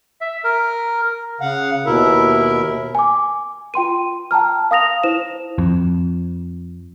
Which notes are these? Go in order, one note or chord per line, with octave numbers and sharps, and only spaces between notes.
E5
A#4
C#3 F5 F#5
D#2 B2 E4 A#4 E5
G#5 D6
F4 G5 C6 D#7
G5 A5 A#5 F6
F5 D#6 A#6 F7
E4 C5 E7
F2